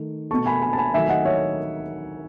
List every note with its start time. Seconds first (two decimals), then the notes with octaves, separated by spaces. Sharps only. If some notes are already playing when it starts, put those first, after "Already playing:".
Already playing: D#3 A3
0.30 B2 A3 A5 C#6
0.46 G#5 B5
0.62 G#5 B5
0.73 A5
0.78 G#5 B5
0.94 D#3 F#3 A3 E5 G#5
1.09 D#5 F#5
1.25 C#5 E5